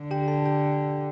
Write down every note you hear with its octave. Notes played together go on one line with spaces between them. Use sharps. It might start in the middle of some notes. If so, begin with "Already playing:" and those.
Already playing: D3
G4 G5
A4 A5
G4 G5